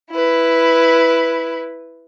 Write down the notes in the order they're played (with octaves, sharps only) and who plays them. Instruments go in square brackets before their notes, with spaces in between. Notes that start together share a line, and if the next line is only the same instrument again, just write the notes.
[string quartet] E4 B4